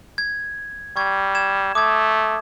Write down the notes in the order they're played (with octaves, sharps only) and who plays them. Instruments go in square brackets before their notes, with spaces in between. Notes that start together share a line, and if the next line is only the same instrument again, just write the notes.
[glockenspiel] G#6
[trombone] G3 [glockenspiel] C#6 G#6
[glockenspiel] G#6 E7
[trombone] A3 [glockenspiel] D6 D#6 G#6